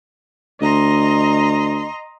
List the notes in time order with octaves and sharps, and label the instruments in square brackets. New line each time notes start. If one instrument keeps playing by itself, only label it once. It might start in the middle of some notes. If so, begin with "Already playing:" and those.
[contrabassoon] D2 [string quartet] D#5 A#5 C6